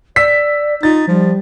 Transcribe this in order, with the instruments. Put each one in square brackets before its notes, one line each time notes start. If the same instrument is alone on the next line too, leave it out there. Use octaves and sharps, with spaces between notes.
[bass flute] D5 [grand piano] E6 B6
[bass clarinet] D#4 [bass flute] F4 [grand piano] A6
[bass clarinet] F3 [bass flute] G3